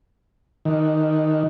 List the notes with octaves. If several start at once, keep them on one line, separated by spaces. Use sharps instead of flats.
D#3